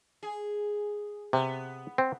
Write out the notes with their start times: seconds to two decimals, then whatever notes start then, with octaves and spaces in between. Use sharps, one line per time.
0.23 G#4
1.33 C3 B3
1.98 C4